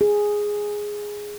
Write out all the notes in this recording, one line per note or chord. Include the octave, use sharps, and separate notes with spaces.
G#4